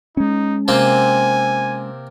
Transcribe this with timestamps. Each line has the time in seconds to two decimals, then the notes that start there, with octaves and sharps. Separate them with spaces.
0.17 G#3 C#4 D#4
0.68 C3 A#3 C4 G#5